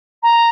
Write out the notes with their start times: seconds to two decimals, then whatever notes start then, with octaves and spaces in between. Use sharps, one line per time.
0.22 A#5